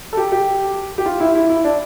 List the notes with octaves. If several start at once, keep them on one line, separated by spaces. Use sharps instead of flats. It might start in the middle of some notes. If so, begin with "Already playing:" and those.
A4
G4
G4
G4
F4
E4
E4
E4
D4